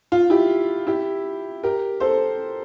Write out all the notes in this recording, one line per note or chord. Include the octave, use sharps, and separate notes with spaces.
F4
E4 G4
E4 G4
G4 A#4
A4 C5